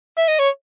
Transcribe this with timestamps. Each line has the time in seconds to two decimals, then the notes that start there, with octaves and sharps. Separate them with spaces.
0.17 E5
0.28 D#5
0.39 C#5